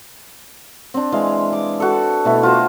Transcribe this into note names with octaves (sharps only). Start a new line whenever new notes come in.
C4 D4
E3 G#3 F5
D6
F#4 A4
B2 A3 E4
F4 F#4 C5